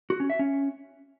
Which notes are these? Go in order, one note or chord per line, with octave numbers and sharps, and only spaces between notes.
F#4
C#4
E5
C#4